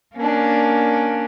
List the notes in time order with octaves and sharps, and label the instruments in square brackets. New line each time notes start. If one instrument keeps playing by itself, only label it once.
[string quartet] A#3 C#4 D4